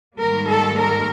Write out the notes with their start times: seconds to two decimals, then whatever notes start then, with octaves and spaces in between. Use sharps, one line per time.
0.17 G#2 D#3 G3 A#3 A#4
0.46 A4
0.76 A#4